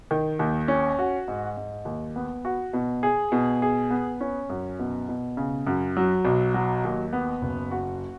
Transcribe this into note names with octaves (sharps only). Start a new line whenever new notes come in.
D#3
D#2
C#4
F#4
G#2
G#2
D#2
B3
F#4
B2
G#4
B2
G#4
B3
C#4
F#2
B2
B2
C#3
F#2
F#3
B1
F#3
D#2
B3
F#1
F#4